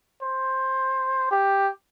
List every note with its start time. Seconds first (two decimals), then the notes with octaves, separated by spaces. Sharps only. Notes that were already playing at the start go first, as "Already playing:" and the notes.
0.22 C5
1.31 G4